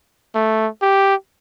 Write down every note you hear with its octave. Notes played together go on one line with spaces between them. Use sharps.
A3
G4